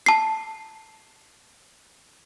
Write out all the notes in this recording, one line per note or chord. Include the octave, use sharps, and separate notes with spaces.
A5 C7